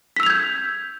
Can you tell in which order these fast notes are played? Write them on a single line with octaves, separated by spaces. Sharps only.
B6 E6 F7 G#6 G6